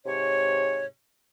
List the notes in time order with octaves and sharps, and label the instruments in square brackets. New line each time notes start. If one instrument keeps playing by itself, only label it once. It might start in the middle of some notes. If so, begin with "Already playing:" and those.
[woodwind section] G#2 C3 C#5